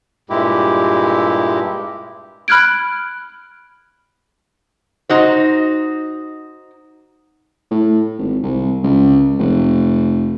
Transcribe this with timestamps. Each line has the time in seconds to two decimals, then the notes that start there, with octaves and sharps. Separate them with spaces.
0.30 G2 A#2 G#3 E4 G4
2.48 B5 F6 F#6 G#6 D7
5.09 D#4 F#4 C5
7.71 A2
8.18 G#1
8.43 C2
8.83 C#2
9.39 F1